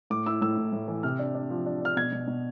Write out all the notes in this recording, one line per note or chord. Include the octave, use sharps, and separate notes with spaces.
A2 D6
E4 E6
A2 E6
A2
A2
E3
C3 F6
D4
D4
F3
D4
D4 F6
B2 G#6
B2
B2